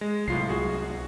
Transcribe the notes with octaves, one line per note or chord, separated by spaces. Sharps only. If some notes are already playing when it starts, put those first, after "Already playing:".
G#3
C2 A2 F#3 F4 C7
F#4 G#4